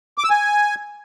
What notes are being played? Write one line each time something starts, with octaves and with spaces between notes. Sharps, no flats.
D6
E6
G#5